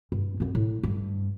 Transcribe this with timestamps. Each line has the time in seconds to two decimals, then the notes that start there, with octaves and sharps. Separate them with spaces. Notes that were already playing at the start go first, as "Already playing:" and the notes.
0.12 G2
0.40 F#2 C4
0.55 A2
0.83 G2